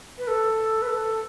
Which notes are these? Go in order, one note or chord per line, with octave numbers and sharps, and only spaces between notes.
B4
A4
B4
A4